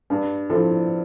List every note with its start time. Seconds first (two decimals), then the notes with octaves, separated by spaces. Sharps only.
0.10 G2
0.50 F3 C4 E4 A4